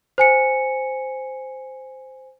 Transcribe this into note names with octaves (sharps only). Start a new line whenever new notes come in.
C5 G#5 C#7